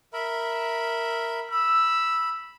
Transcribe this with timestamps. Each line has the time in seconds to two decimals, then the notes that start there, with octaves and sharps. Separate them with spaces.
0.13 A#4 E5 B5
1.51 B5 E6